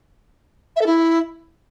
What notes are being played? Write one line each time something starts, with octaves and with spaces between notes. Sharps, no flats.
E5
A4
E4